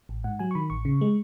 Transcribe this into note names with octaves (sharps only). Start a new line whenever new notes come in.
A1
G#2 F#5
F#3 G#5
C#6
D#3 B5
A1 C#6
C#3
G#3